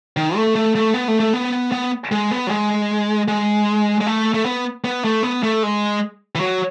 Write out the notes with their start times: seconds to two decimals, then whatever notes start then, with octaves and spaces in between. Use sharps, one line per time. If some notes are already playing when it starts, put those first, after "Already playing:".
0.17 D#3
0.36 A3
0.55 A3
0.75 A3
0.94 B3
1.08 A3
1.20 A3
1.33 B3
1.72 B3
2.12 G#3
2.31 B3
2.47 F#3
2.51 G#3
3.28 G#3
4.01 G#3
4.06 A3
4.34 A3
4.46 B3
4.84 B3
5.05 A3
5.23 B3
5.43 A3
5.63 G#3
6.35 E3
6.40 F#3